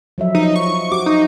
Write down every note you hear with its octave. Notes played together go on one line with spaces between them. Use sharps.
F3 F#3 E5
F3 D#4
C#6
F#4 D6
D#4